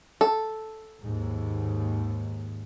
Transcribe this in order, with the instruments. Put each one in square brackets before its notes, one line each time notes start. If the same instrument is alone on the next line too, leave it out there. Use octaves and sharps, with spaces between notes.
[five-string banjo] A4
[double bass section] D#2 G#2